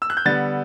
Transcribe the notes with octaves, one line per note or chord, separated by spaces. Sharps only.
E6
F#6
G6
D3 G3 B3 A6